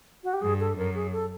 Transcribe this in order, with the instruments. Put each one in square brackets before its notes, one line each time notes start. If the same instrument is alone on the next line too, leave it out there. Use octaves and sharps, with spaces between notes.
[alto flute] F#4
G4
[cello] G2 [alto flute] G#4
[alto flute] A4
[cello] F#2 [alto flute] A#4
[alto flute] G#4
A4